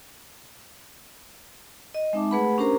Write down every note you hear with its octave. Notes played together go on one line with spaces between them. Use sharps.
D#5
G#3 C4 D#4 E5 A5 D6
A3 G#4 B4 F#5 B5
C#4 D4 G4 A#4 C5 A#5